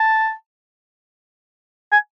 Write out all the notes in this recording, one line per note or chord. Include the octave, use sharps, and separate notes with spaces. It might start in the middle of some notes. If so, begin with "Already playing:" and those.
Already playing: A5
G#5